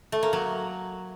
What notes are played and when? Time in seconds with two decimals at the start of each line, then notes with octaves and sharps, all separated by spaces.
0.12 A3
0.23 A#3
0.33 F#3